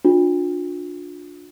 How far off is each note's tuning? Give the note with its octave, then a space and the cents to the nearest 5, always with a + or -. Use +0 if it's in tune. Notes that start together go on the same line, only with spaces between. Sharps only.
D4 +0 F4 +40